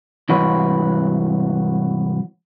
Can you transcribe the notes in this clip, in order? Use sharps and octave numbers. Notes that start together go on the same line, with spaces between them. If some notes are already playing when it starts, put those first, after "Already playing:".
C2 G#2 E3 F#4 B4 C#5